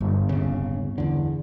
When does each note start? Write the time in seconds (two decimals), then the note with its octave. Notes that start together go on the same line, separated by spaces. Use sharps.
0.01 G1
0.29 D1 C#3
0.98 E2 D3